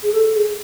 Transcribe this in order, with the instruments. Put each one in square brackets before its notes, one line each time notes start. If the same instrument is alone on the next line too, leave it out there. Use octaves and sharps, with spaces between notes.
[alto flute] G#4
A4
G#4